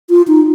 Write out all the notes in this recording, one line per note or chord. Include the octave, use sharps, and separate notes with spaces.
F4
D#4